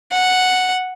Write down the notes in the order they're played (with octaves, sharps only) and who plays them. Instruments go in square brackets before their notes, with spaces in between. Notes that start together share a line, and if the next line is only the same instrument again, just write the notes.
[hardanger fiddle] F#5